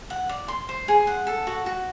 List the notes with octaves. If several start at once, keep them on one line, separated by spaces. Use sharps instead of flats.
F#5
D5
C6
C5
G#4
F#5
A4
F#4
F#4